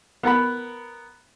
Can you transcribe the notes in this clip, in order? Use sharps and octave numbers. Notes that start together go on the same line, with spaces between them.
B3 A#4 F#5 B5